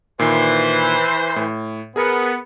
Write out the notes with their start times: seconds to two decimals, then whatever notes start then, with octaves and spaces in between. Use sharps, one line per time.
0.19 A#2 D#3 E3 C5 C7
1.36 A2
1.96 B3 G#4 A#4